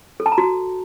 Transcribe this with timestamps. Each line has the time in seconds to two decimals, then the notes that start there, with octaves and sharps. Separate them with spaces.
0.20 A4
0.26 A5
0.32 A#5
0.38 F#4